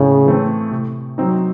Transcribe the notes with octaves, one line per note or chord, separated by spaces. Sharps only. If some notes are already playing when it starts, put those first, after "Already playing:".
Already playing: A2 C#3
E3 A3 C4
C3
F#3 C4 D#4